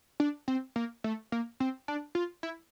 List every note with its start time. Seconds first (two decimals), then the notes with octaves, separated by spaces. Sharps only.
0.20 D4
0.48 C4
0.76 A#3
1.04 A3
1.32 A#3
1.60 C4
1.88 D4
2.15 F4
2.43 E4